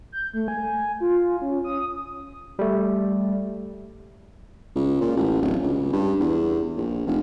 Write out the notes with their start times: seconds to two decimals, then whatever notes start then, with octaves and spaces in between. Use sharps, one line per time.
0.12 G6
0.34 A3
0.48 G#5
1.00 F4
1.42 C#4
1.64 D#6
2.59 G3 A3
4.75 C#2
5.01 A#2
5.17 A1
5.42 D1
5.63 C#2
5.93 G2
6.20 E2
6.77 A#1
7.07 F1